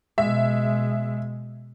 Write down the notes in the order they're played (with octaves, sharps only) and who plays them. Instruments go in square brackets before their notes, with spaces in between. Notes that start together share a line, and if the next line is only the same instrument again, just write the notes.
[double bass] B2 G#3 [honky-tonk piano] E5